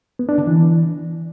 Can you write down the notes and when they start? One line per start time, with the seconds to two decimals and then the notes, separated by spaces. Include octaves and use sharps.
0.19 B3
0.29 D4
0.38 D3
0.47 E3